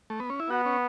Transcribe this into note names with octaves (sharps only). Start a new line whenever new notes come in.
A3
B3
C#4
E4
B3 F#4
C#4